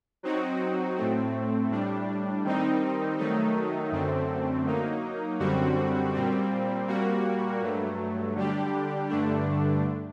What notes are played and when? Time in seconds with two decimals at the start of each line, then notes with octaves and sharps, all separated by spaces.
0.23 F#3 C4 D#4 F#4
0.96 A2 A3 C4
1.70 A2 G3 D4
2.45 D#3 G3 C4 D#4
3.18 D#3 F#3 A3 D#4
3.92 F#2 D3 A3 C4
4.66 F#3 A#3 D#4
5.40 F#2 D3 G3 C4 F#4
6.14 A#2 G3 C4
6.87 A#2 G3 A#3 F#4
7.62 G2 F#3 A3
8.35 D3 G3 D4 G4
9.09 G2 D3 A3 D4